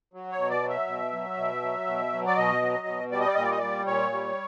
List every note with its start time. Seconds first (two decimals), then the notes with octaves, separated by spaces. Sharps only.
0.14 F#3
0.32 C#5
0.38 B2
0.50 D5
0.63 F#3
0.69 E5
0.87 B2
1.13 F#3
1.37 B2
1.63 F#3
1.87 B2
2.12 F#3
2.27 D5
2.37 B2 D#5
2.62 F#3
2.87 B2
3.11 G3 D5
3.20 D#5
3.28 D5
3.35 A#2 D#5
3.43 D5
3.51 D#5
3.58 G3 D5
3.86 A#2 C#5
4.12 G3